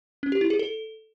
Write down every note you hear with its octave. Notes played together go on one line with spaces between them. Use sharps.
C#4
G4
E4
G#4
A4